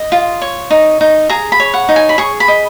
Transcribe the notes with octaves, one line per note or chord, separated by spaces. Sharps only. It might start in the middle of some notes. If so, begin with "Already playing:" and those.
Already playing: D#5
F4
C#5
D#4
D#4
G#4 A#5
B5
C#5
F#5
D#4
G#5
B5
G#4 C#6
B5
D#5